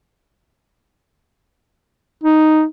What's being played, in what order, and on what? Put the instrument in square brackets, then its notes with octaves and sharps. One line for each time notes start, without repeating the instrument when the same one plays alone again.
[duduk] D#4